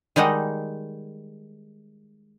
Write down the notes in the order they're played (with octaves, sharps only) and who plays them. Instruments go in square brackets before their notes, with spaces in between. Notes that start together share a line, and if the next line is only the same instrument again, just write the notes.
[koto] D#3 G3 G#3 D#4 F#5